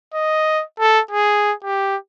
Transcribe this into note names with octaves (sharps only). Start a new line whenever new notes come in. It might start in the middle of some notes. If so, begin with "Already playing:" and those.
D#5
A4
G#4
G4